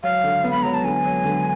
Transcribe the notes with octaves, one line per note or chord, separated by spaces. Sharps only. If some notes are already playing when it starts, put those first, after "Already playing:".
F#3 F5
D3
B3
B5
F#3 A#5
A5
D3 G#5
F#3
D3